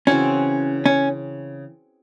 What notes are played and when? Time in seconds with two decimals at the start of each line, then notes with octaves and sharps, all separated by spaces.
0.07 C#3 E3 C4 C#4 F#4
0.86 C#4